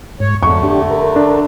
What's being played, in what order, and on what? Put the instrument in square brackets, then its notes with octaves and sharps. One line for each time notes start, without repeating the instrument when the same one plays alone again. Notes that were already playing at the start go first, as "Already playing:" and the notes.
[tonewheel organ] G#2 [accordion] C#5
[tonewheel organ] F2 [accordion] D3 A3 [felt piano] C#6
[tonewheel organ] D4 G4
A#4
[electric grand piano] D4